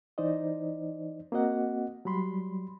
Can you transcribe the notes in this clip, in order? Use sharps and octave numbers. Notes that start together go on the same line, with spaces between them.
E3 D#4 C5 D5 D#5
A#3 C4 F#4 D#5 F#5
F#3 G3 B5 C6